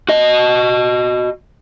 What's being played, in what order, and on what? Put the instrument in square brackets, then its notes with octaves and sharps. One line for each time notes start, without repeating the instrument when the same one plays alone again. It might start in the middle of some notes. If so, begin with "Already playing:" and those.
[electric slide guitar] F#4 D#5